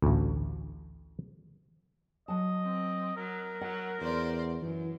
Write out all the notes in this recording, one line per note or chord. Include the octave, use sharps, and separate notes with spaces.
A1 D2
F#3 D#5 A5
C4
F#3 A#4
F#3 F#5
E2 C5 D5 C6
F#2 E3